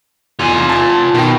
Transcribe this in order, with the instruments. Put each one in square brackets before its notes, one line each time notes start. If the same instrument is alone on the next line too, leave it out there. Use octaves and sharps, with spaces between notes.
[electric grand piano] E2 [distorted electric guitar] F4 G#5
[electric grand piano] A5 G#6
[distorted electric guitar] B2 [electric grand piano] D#3 G5